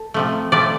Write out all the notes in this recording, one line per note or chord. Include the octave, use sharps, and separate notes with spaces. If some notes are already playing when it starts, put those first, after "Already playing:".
Already playing: A4
C3 F3 A3
C3 F3 A3 D5